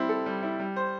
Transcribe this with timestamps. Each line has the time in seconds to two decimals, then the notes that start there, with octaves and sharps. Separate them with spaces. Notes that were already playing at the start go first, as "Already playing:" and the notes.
Already playing: G3 C4 E4
0.09 A4
0.26 G3
0.43 E4
0.59 G3
0.76 C5